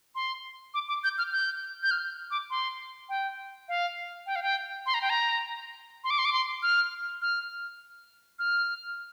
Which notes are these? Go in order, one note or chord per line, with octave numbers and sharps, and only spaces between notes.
C6
D6
D6
G6
F6
G6
G6
F6
D6
C6
G5
F5
G5
F5
G5
C6
A#5
G5
A#5
C6
D6
C6
D6
C6
F6
F6
F6